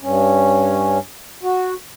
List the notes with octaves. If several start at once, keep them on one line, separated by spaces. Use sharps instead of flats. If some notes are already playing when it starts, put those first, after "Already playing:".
G2 C#4
F#4